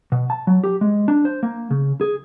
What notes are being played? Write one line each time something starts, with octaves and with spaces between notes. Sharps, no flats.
B2
A5
F#3
G4
G#3
D4
C5
A#3
C#3
G#4